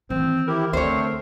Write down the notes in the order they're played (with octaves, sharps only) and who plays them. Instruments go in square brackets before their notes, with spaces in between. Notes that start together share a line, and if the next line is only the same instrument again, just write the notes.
[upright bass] D#3 E3 [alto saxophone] C4
[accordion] E4 G4 [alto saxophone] A#4
[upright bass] D2 [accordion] A3 C4 [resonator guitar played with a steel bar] C5 C#5